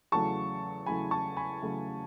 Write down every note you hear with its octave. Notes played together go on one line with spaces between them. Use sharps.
E2 C#3 F#3 A3 A5 C#6
E2 C#3 F#3 A3 G#5 B5
A5 C#6
G#5 B5
E2 C#3 F#3 A3